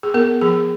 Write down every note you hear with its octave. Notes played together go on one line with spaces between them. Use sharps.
G#4
B3 A#4
F3 G#4